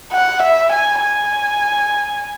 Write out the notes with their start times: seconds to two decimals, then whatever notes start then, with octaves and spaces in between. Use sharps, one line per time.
0.12 F#5
0.42 E5
0.72 G#5
1.02 G#5